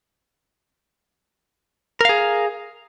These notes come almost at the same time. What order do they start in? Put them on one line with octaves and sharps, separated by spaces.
A#4 F5 G#4